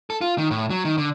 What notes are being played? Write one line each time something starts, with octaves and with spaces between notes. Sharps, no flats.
A4
F4
D#3
A2
F#3
D#3
D3